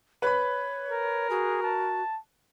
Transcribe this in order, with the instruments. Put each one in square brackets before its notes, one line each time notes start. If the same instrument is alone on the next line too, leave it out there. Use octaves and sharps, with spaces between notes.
[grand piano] B4 B5 [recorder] C#5
[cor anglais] A#4
[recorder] F#4 [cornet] G#4
[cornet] A5